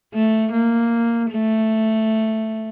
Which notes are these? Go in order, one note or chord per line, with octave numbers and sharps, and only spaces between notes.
A3
A#3
A3